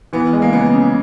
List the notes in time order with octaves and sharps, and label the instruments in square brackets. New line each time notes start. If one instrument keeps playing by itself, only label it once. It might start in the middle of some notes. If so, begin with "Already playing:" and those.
[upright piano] E3 [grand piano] B3
[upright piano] G#3
[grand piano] A#3
[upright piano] C#3 [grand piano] B3
[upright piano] C#3